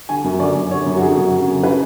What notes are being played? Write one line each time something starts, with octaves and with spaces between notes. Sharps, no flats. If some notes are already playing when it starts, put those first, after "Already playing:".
D3 G#5
F#2
D3 D5
F#2
D3 C#5
F#2
F#4
D3 G#4
F#2
C#3
F#2
C#3 B4